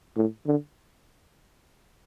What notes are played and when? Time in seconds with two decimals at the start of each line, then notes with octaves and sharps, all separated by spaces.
0.17 A2
0.46 D3